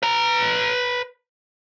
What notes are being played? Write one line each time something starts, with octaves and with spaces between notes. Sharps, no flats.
B4 A#5